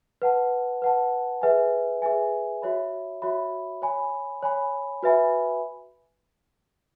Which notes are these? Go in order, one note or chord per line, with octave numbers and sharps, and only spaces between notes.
B4 F#5 A5
B4 F#5 A5
G#4 B4 E5 G#5
G#4 B4 E5 G#5
F#4 C#5 E5 B5
F#4 C#5 E5 B5
C#5 G#5 B5
C#5 G#5 B5
F#4 B4 E5 G#5 B5